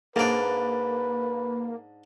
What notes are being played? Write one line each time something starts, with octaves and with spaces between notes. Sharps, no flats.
G#2 A#3 D4 B4